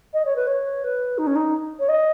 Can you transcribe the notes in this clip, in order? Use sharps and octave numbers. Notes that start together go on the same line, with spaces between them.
D#5
C#5
B4
C#5
B4
D#4
C#4
D#4
C#5
D#5